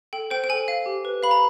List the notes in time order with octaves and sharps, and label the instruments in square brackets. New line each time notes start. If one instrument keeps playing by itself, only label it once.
[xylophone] A4 G5
C5 G5
G5
A4 G#5
F5
G4
B4
F5 B5
A#5